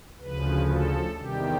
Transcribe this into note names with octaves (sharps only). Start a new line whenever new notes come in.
D2 C#3 F3 B4
A4
E2 C3 D#3 G3 G4